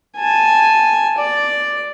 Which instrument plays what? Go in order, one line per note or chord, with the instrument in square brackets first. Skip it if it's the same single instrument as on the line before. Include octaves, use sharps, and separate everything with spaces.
[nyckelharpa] G#5 A5
D5